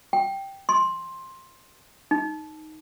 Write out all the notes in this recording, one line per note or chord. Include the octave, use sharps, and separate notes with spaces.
G5
C6
D#4